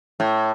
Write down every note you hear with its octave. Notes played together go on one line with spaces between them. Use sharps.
A2